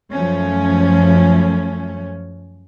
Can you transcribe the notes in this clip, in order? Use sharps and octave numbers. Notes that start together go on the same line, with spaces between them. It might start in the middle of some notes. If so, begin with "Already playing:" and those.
F#2 F3 A3 C#4